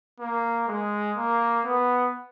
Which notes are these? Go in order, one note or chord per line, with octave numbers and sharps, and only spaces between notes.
A#3
G#3
A#3
B3